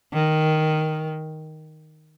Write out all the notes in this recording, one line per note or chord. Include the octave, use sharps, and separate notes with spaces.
D#3